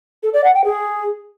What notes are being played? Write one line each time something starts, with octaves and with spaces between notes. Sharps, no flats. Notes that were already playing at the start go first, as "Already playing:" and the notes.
A4
D5
F#5
G5
G#4